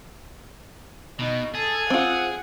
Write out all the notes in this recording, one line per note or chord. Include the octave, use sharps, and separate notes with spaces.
B2 D#4
G#4 A4
C4 F4 F#5